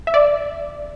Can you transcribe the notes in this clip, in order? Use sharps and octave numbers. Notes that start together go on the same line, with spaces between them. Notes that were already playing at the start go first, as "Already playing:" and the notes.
E5
D5